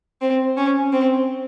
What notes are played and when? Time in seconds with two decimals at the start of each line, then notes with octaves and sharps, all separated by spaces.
0.21 C4
0.57 C#4
0.92 C4